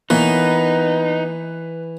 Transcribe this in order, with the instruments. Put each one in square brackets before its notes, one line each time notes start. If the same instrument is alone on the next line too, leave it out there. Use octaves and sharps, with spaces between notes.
[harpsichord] E3 [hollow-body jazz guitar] A#3 B3 C#5 [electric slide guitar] D#4 [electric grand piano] B4